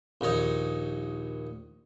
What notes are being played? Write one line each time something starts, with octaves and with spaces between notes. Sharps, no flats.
A#1 D#2 D#4 C#5